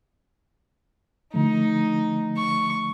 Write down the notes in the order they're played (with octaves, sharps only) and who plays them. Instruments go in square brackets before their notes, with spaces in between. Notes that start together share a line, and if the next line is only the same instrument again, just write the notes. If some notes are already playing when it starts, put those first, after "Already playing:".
[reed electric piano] D3 F3 A3 [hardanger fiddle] D#4
[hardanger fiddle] C#6